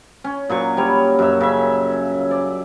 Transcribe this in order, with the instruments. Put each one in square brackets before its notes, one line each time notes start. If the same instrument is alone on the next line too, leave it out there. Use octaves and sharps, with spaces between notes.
[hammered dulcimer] C#4
A#2 F#3 C#6
G3 C#5
F#2 E5
C#3 E5
D5